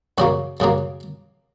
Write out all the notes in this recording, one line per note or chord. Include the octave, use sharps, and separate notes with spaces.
F#2 C#3 F#3 A#3 F#4
F#2 C#3 F#3 A#3